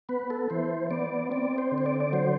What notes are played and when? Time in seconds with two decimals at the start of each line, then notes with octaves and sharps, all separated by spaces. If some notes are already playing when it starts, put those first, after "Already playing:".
0.09 B3 B4
0.30 A4
0.50 E3 C5
0.91 B3 D5
1.31 C4 D5
1.58 C5
1.72 D3
1.78 C5
1.86 D5
2.00 D5
2.13 F#3 C5